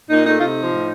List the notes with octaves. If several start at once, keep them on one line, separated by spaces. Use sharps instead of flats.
A#2 D#4
A3 D#4
F4
C3 D#4
F3
A2